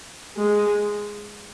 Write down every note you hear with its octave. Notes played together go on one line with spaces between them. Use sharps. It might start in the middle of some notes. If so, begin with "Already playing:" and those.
G#3